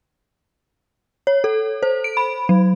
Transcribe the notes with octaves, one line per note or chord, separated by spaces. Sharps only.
C#5
A4
C5
D7
B5
F#3